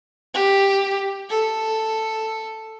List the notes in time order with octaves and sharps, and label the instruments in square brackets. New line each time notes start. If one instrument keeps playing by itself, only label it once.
[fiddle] G4
A4